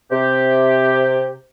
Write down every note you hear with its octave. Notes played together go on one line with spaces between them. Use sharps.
C3 G4